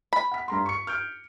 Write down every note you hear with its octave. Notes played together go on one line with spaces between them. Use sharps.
B5
F#5 B6
G2 A#5 C6
C#6 C#7
F6 G6 D7